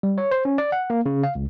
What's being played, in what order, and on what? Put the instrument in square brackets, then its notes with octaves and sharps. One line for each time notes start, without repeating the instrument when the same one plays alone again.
[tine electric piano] G3
C#5
C5
C#4
D5
F#5
A#3
C#3
F5
C#2